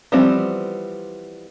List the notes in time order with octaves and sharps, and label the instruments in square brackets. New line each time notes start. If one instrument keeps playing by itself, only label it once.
[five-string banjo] E3 F3 G3 B3 C4